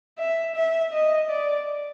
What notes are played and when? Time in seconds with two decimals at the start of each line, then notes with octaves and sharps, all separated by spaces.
0.19 E5
0.56 E5
0.93 D#5
1.30 D5